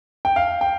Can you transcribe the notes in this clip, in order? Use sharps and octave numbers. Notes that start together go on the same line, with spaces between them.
G5
F5
G5